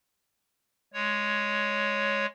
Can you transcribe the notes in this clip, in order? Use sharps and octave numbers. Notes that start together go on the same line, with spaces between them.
G#3 C#5